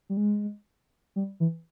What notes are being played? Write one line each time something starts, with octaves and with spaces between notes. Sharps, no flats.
G3
G#3
G3
E3